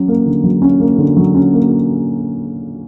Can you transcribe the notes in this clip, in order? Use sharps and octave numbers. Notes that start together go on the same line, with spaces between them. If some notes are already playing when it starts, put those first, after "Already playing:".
Already playing: F#3 C#4
A#3
D3
F#3
C#4
A#3
D3
F#3
C#4
A#3